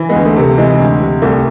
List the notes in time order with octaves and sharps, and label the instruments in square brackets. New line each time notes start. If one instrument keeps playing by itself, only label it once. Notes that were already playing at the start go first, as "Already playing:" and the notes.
Already playing: [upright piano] E3
G#3 B3
D2
A3
C3
A3
E3 G#3
D2
C3
C2 A3